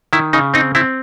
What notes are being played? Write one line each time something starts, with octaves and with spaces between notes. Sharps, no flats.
D#3 E4
C#3 D#4
C4 D#4
C4 E4